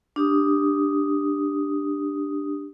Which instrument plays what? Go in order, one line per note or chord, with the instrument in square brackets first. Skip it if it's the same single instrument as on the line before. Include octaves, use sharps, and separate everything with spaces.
[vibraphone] D4 G4 D#6